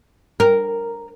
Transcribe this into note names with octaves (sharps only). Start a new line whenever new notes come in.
A#4